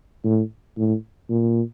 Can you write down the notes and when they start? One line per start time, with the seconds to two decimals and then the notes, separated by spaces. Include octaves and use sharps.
0.24 A2
0.78 A2
1.29 A#2